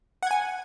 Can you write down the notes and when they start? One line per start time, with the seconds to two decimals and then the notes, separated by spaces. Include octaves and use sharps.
0.23 F#5
0.27 G#6
0.31 G#5